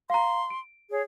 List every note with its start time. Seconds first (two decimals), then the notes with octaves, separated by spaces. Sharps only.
0.10 F5 A#5 C6
0.50 D7
0.90 G#4 C#5